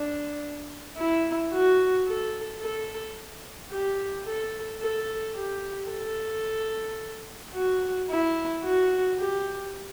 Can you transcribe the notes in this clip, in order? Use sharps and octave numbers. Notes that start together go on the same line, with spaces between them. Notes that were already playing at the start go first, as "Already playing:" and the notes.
Already playing: D4
E4
F#4
A4
A4
G4
A4
A4
G4
A4
F#4
E4
F#4
G4